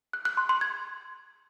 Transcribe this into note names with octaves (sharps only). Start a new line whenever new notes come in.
F#6
F#6
C6
C6
G#6